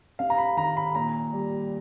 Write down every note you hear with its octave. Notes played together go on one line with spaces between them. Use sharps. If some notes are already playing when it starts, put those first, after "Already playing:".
C3 F5
A#5
B5
D#3 A#5
B5
A#2 A#5
G3